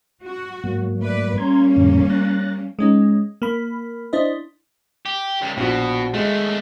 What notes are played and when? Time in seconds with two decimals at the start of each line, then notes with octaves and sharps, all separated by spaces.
0.23 F#4
0.64 G#2 F#3 A#3
1.00 A3 B4 D5
1.38 G3 A#3 C#4 A#5 C6 G#6
1.76 F2 A2 D3
2.10 F#6 A6 A#6
2.79 G#3 C#4 D#4
3.42 A#3 B5
4.13 D4 E4 C5 D#5
5.06 G4
5.42 C#2 G3
5.57 A#1 B2 F#4
6.14 D#2 G#3 A3